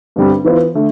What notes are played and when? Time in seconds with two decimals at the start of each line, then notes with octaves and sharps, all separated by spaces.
0.16 G2 D3 G3 C4
0.44 E3 B3 F4 C5
0.74 D3 A3